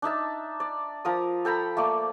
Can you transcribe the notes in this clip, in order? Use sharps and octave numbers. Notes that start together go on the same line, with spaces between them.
D4 D#4 E5 A5
D5
F3 A#4 D#6
A4 G5 A#5 B5
A3 A#3 D5